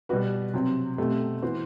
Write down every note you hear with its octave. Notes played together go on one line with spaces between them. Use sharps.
B2 G3 B3 F#4 B4
C3 F#3 C4
B2 A3 C4 G4
E3 B3 F#4 C5